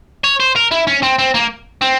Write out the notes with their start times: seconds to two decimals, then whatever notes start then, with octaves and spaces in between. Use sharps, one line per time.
0.24 C#5
0.40 C5
0.56 A#4
0.71 E4
0.87 C#4
1.03 C4
1.19 C4
1.34 A#3
1.82 C4